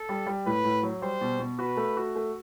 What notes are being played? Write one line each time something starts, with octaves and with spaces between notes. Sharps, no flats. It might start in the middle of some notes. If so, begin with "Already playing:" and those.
Already playing: A4
G3
G3
A2 B4
A2
F#3
G3 C5
B2
B2
F#4 B4
A3
F#4
A3